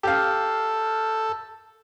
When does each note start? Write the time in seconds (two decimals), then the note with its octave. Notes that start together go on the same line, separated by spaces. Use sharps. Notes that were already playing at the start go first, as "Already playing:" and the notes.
0.03 G4 A4 F5